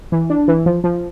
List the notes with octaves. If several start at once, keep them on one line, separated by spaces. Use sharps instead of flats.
E3
D4
E3
F3
F3